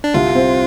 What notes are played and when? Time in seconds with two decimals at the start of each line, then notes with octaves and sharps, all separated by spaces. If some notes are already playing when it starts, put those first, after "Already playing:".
0.04 D4
0.14 C2 F4
0.35 C4